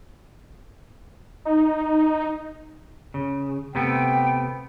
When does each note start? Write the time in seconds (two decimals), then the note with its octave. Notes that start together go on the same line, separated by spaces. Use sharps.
1.45 D#4
3.14 C#3
3.75 C3 A3 B3 G5